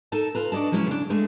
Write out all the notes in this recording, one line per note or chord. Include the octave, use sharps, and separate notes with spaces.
D#4 A4 A#4 A5
F4 B4 A#5
D4 F#4 D5 D#5 A5
F3 F#3 G#3 C#4 E4
C#3 D4
G2 G#3 A3 D4